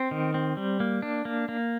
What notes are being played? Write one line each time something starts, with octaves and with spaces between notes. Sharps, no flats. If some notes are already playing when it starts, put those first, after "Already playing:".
Already playing: C4
D#3
C4
G3
A#3
D4
A#3
A#3